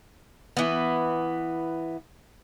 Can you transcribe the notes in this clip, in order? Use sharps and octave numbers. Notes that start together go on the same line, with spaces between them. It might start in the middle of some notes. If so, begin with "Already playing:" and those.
E3 B3